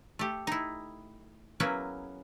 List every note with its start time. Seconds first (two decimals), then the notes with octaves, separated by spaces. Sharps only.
0.19 A3 G4
0.47 D#4 E4
1.60 F#3 A#3 B3 C#4 E4 G#4